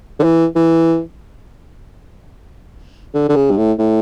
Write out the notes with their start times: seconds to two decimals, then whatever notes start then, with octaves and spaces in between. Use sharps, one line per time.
0.19 D3
0.23 E3
0.55 E3
3.14 D3
3.29 D3
3.36 C#3
3.51 G2
3.58 A2
3.79 A2